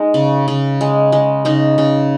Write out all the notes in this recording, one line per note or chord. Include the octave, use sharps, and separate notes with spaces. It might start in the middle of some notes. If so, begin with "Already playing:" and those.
Already playing: G#3 D#4
C#3
C#3
G#3
G#3
C#3 D#4
C#3